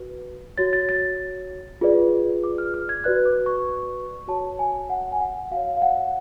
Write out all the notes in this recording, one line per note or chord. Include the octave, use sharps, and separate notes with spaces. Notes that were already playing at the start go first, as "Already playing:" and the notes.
Already playing: F#4 B4
F#4 C#5 A6
A6
A6
F4 G#4 B4 D5
D6
F6
F6
G#6
F#4 B4 D5 F#6
D6
C#6
F#4 C#5 A5
G#5
F#5
G#5
F#5
F#4 C#5 F5
F5
F#5